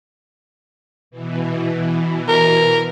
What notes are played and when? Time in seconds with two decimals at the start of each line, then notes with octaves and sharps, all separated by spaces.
1.11 B2 E3
2.28 A#4